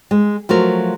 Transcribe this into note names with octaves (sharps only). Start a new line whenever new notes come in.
G#3
F3 F#3 A3 A#4